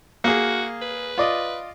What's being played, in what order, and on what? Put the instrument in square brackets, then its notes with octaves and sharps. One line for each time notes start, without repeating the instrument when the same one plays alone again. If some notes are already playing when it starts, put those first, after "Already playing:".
[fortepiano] A#3 G#4 [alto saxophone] F#4
[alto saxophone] B4
[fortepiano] F4 D5 D#5